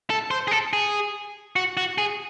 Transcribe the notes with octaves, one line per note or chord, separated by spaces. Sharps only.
A4
C5
G#4
A4
G#4
F#4
F#4
G#4